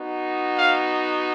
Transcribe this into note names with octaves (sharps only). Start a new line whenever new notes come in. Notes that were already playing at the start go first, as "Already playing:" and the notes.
Already playing: B3 D#4 F#4
F5